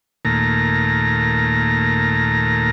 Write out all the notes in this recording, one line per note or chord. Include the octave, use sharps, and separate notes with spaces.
D#2 A#2 A3 A#5